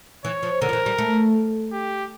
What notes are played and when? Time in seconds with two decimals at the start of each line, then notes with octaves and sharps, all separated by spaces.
0.24 E3 C#5
0.43 F3
0.61 D3 A#4
0.69 F3
0.73 E3
0.86 G3
0.98 A3
1.72 G4